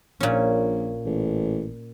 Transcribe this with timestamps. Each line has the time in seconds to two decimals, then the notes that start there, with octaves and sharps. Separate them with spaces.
0.20 A#1 A#2 C#4
1.05 A1